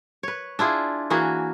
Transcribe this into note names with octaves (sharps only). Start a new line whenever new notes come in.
B4 C#5
D4 E4 F4 G#4
E3 A#3 F#4 G#4